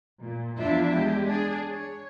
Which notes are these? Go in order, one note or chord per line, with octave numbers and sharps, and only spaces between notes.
A#2
E2 F3 D4 E4 F4 E5
G#3 G4
D4 G#4
C#5